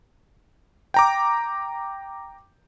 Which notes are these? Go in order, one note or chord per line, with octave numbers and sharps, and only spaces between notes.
G5 A#5 D6